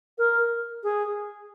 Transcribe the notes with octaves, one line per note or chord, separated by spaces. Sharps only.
A#4
G#4